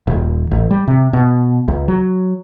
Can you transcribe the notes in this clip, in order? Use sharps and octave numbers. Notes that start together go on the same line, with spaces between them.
D#1
A1
G3
C3
B2
C#2
F#3